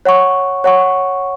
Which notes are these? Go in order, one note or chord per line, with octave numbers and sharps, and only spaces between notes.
C#5 F#5 C#6
C#5 F#5 C#6